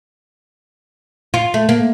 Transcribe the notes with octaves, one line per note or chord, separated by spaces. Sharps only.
F4
A3
A#3